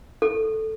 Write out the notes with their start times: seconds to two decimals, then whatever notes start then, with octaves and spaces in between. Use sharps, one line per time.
0.22 A4